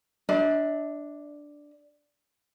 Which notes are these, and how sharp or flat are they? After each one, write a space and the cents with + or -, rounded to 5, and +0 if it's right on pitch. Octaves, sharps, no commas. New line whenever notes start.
D4 +0 E5 -40